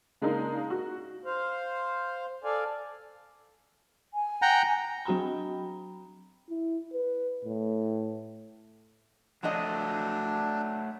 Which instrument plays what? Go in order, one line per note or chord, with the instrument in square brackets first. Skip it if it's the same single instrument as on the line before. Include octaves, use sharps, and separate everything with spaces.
[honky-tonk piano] C#3 G#3 A#3 D4 D#4 A#4
F#4
[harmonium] C5 F5
A4 D5 F5 G#5
[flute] G#5
[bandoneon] F#5 G5 A#5
[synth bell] F#3 D4 F#4 G5 A#5 B5
[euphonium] E4
B4
A2
[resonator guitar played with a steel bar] F3 F#4 D#5 [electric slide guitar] F#3 A3 [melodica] D4